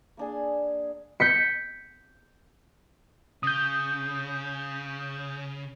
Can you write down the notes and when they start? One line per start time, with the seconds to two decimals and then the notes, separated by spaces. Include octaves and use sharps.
0.17 A#3 D4 G#4
1.20 G6 B6 C#7
3.43 C#3 D#6 G6